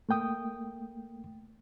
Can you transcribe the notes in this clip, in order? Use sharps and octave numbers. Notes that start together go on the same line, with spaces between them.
A3 A#3 G5 D#6